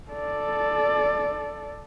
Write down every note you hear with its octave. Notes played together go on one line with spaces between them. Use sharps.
A4 D5